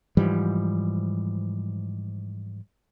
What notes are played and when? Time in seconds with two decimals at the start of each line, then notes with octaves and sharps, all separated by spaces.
0.17 G#2 E3 F3 G3